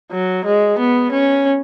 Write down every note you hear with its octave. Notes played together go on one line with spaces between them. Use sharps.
F#3
G#3
B3
C#4